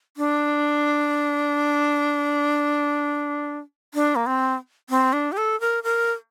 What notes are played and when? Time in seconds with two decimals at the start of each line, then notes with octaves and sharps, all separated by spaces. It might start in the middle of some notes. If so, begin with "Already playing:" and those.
0.17 D4
3.94 D4
4.16 A#3
4.26 C4
4.90 C4
5.13 D4
5.32 G4
5.37 A4
5.60 A#4
5.83 A#4